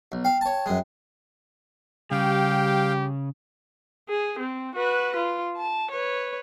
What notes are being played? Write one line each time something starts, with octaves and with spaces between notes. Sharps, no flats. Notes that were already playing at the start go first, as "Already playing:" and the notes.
B1
F5 G5
C#5 A5
F#2 G#3
C#3 G3 G4 F5 G5
G#4
C4
F#4 B4
F4
A5
B4 C#5